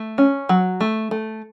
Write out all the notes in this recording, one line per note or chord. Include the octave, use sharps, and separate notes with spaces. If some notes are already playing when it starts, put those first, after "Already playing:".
Already playing: A3
C#4
F#3
A3
A3